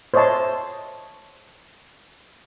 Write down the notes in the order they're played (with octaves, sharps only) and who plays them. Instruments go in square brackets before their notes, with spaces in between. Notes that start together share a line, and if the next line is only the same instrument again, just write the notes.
[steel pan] C5 C#5 D#5 E5 A5 C6